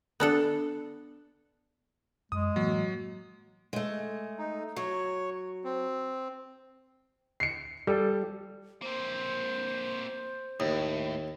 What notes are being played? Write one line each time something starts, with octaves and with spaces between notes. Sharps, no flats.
B3 D4 A4
F#2 G#3 D#6
A2 E3 F#3 A#3
G#3 A3
D#4
F#3 C#5
C4
C7 C#7
G3 A4
A#3 C4 C5
D#2 A2